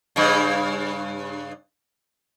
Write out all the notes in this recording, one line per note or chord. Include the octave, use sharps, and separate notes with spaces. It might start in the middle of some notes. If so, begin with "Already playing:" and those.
G2 C#3